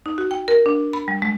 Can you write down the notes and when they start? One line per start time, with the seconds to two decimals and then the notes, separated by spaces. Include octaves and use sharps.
0.06 D#4
0.18 F#4
0.31 G5
0.48 A#4
0.66 D4
0.93 B5
1.08 G3
1.22 G#3